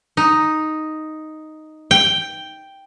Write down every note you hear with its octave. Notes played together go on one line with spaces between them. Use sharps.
D#4
G5